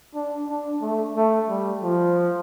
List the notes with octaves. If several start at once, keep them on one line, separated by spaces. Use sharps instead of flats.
D4
D4
A3
A3
G3
F3